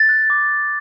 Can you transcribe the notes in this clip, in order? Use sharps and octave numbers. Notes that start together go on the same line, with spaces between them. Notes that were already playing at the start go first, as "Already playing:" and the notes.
Already playing: A6
F#6
D6